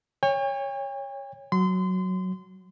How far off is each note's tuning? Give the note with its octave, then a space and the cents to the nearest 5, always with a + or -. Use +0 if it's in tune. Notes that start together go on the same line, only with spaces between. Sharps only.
C#5 +0 G5 +45
F#3 +0 C6 -30